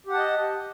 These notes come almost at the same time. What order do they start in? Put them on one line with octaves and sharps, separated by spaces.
G4 F#5 A5 D#5